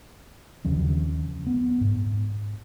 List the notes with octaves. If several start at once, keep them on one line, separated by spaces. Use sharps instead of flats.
D#2 C#3 F3 C#4
B3
G#2